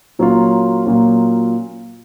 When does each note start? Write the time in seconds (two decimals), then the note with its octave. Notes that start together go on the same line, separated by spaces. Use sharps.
0.19 A#2 F#3 A#3 C#4 F4
0.86 A#2 F#3 A#3 C#4 F4